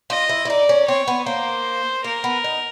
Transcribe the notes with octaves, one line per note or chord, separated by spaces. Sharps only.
F4 D#5
E4
E4
D#4 D5
C#4
C4 C#5
B3
A#3 C5
A#3 A#4
B3
D#4